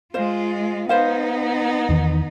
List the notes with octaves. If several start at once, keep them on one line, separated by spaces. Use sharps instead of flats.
G#3 F4 C5 F5
B3 D#4 B4 C5 F5
E2 D#3